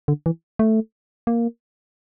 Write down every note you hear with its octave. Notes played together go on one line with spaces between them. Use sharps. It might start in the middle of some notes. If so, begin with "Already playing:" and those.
D3
E3
A3
A#3